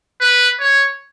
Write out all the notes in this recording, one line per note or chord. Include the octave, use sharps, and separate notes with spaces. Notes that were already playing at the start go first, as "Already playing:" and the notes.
B4
C#5